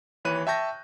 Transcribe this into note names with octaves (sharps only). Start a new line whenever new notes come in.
D#2 E3 C#5 B5 F#6 D#7
E5 G5 A5 C#6 G6 A#6